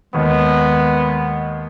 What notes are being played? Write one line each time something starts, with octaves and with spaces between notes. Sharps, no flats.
D#2 G#3 B3